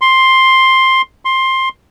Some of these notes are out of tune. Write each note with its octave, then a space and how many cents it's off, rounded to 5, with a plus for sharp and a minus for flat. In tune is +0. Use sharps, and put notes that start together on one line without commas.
C6 +10
C6 +15